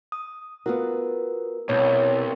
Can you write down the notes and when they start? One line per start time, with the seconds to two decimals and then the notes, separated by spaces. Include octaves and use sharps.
0.12 D#6
0.66 B3 F4 F#4 A#4
1.69 C2 B2 C#5